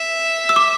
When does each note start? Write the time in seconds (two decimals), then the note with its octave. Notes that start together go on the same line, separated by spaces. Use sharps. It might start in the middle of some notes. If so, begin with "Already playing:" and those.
Already playing: E5
0.49 E6
0.56 D6